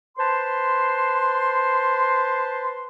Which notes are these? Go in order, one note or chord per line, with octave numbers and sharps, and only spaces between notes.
B4 C5 A5 C6